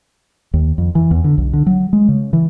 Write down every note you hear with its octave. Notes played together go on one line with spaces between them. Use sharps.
D#2
F2
E3
E2
D3
B1
D3
F#3
G#3
C#3
E3